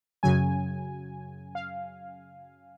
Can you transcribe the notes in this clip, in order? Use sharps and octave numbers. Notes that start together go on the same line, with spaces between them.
F#2 C#3 F#3 G#5
F5